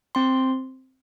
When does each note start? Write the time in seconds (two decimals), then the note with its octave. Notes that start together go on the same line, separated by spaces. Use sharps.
0.15 C4 C6